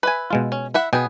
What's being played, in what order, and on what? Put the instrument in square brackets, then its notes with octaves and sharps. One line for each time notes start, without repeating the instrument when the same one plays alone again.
[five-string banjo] B4 E5 G#5
[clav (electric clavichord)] B2 G#3 F4
[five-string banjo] C#4
E4 E5 F#5
[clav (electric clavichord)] B2 G5 [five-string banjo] B3 G#4